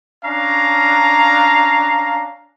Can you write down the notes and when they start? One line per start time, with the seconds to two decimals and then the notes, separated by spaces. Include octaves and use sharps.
0.25 C#4 D4 F5 A#5